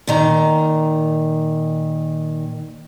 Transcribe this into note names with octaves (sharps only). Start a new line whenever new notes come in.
A#2 D#3 A#5